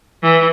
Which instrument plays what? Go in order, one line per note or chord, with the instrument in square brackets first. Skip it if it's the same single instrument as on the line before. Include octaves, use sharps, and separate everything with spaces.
[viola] E3